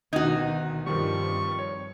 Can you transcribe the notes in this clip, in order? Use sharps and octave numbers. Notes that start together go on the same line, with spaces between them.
D2 B2 D#3 D#4 F#4 G#6
G2 D#3 F3 G3 C4 C#6
C#5